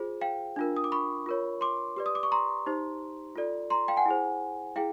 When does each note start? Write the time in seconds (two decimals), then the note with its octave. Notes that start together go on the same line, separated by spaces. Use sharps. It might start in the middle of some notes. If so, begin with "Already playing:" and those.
Already playing: F4 G#4 C5
0.21 F5 G5
0.56 D4 F4 A#4
0.76 D#6
0.84 D6
0.92 B5 C#6
1.26 F4 A#4 C#5
1.61 C6 D6
1.96 G4 B4 D5
2.06 D#6
2.15 D6
2.23 C#6
2.32 A#5 C6
2.66 D#4 G4 C5
3.36 F4 A4 D5
3.70 A#5 C6
3.88 F5 G5
3.97 F#5 G#5
4.06 E4 G#4 C5
4.76 E4 G#4 F5 G5